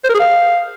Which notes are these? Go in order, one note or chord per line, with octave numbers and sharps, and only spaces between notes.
C5
A#4
G#4
F5